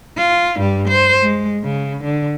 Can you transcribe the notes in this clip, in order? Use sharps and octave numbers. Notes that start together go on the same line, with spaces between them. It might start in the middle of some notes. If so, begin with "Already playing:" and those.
F4
G2 G3
C5
G#3
C#3
D3